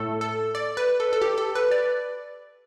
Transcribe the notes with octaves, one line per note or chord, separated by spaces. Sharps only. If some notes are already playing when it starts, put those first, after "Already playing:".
Already playing: A2 A3 A4
A4
D5
B4
A4
A4
G4
A4
B4
D5